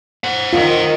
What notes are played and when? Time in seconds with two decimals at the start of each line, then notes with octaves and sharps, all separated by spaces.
0.24 C5 F#5
0.53 D#3 F4